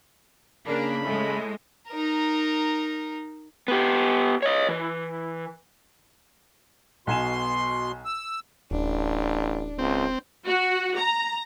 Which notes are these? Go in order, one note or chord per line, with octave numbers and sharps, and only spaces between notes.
C#3 A#3 D4 G#4 B5
A2 G#3
D#4 A#4
B3 G4
C#5 D#5
E3
B1 B2 G#5 C6 E7
E6
D1 A1 D4
C#2 C4
F#4
A#5